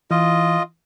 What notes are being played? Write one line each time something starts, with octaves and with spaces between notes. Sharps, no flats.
E3 F4 D#5